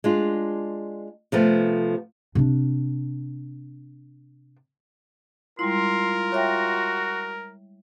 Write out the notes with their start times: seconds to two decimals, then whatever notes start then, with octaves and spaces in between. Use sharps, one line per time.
0.04 G#3 D4 F4
1.32 C3 F3 A3 B3
2.35 C3 D4
5.59 G3 G#3 E4 F4 A#4 C6
6.32 F#4 C#5 E5 G5